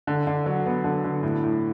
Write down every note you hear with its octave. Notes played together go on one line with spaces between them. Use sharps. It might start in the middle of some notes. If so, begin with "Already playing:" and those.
D3
D3
F#3
B3
D3
D3
A2
A2